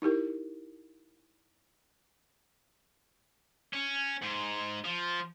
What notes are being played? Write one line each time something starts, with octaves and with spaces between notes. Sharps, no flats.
D#4 E4 G4 A#4
C#4
G#2
F3